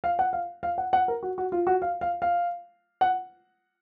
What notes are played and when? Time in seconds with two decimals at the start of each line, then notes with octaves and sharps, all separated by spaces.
0.04 F5
0.19 F#5
0.33 F5
0.63 F5
0.78 F#5
0.93 F#5
1.08 A#4
1.23 F#4
1.38 F#4
1.52 F4
1.67 F#4
1.82 F5
2.01 F5
2.22 F5
3.01 F#5